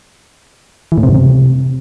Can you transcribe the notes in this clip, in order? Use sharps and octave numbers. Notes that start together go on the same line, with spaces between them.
E3
A2
C3
G2
C3